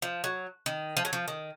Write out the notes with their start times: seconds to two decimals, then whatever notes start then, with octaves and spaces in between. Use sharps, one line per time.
0.02 F3
0.24 F#3
0.66 D#3
0.97 F3
1.05 F#3
1.13 F3
1.28 D#3